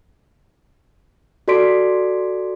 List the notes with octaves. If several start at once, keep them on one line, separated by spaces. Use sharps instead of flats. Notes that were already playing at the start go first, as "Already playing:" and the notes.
F#4 A4 D5 C6 B6 D7